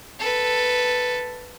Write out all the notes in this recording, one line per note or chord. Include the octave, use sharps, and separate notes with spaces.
A4 B4